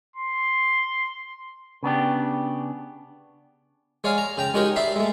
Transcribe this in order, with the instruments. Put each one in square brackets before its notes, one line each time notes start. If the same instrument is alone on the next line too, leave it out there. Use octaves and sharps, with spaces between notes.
[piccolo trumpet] C6
[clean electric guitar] C#3 B3 D4 G4
[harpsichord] G#3 C#5 D5 F5 G#5
A#5
C#3 G5 A#5
G#3 D#4 F#4 G4 A#4 C#5
D5 E5 B5 C6
G#3 A3